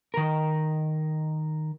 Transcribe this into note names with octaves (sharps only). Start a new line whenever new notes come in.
D#3 A#4